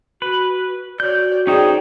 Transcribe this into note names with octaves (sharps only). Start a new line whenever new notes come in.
F#4 B4
F#4 C#5 D5 G6
C#4 D#4 G#4 C5 D5 G5